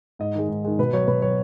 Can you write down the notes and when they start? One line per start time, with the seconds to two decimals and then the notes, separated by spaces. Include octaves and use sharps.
0.19 G#2 D#5
0.35 D#3 G#3
0.49 G#2
0.64 D#3 G#3
0.79 B2 B4
0.93 F#3 C#5
1.07 B2 B4
1.22 F#3 C#5